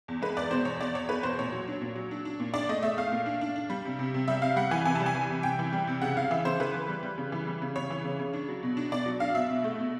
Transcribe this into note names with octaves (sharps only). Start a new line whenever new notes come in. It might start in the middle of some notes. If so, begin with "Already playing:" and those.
E2
G#3 B4
E2 D5
B2 C5
E2 C#5
E2 D5
E2 C#5
E2 B4
B2 C5
A#2 C#5
F#3
D4
A#2
F#3
D4
D4
A#2
D4 D5
A3 D#5
A3 E5
A3 F5
A#2
D4
D4
D4
G3
C3
C3
C3
G3 E5
C3 F5
G3 F#5
E3 G#5
C3 G#5
G3 A5
G#5
E3
C3
C3 G5
E3
G3
C3
C#3 F#5
C#3 F5
E3 E5
C#3 C5
E3 B4
E3
G3
G3
C#3
E3
G3
C#3
C#3 C#5
E3
C#3
C#3
D4
F#3
B2
D4
B2 D5
F#3
D4 F5
B2 E5
B2
A3
B2